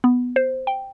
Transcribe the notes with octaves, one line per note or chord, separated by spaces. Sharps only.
B3
C5
G5